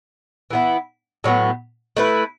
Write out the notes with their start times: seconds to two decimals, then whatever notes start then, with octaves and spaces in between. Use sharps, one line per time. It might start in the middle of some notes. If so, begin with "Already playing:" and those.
0.51 E3 B3 E4
1.24 A2 F#3 B3
1.97 A3 E4 B4